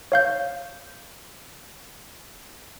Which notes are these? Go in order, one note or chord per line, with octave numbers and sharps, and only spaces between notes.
C#5 F5 G6